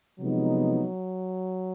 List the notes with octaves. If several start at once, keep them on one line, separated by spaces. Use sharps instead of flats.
C3 F3 F#3 G#3 B3 D#4